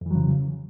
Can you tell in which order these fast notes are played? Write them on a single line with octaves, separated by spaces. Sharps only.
F2 E3 F#3 C#3